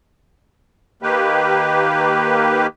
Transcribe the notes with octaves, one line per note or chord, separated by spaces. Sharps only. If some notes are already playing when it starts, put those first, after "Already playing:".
D#3 A#3 G4 B4